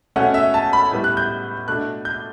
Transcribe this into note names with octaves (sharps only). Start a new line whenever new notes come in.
B2 A3 C#4 F#5
E5
A5
B5
A2 G3 B3
F#6
G6
B2 A3 D4 F#6
G6